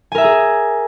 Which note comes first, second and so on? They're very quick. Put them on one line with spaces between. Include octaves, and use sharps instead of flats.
G#5 A#4 E5 A#5 G#4